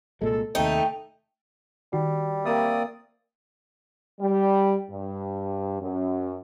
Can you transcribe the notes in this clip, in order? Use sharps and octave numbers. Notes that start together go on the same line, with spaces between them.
C2 A#2 G#3 A4
D#2 C3 A3 D#4 G5
D#3 G3 F#4
A#3 C4 A#4 D5 E5 D#6
G3
G2
F#2